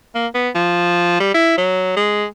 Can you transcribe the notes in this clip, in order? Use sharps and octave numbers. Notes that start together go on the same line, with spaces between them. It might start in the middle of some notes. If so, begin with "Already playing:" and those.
A#3
B3
F3
G3
E4
F#3
G#3